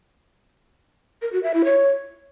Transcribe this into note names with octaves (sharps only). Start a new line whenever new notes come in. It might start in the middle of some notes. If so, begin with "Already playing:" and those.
A#4
F#4
E5
E4
C#5